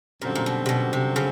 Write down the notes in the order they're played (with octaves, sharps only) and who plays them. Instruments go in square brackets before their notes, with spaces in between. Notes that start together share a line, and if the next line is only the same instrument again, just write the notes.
[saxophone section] F#2 D3 G3 C4 [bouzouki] A#2
[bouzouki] A#2
B2
C3
B2
C3
C#3